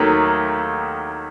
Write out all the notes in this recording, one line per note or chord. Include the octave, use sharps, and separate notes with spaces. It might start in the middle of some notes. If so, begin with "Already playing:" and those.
Already playing: D#2 D#3 F#3 A3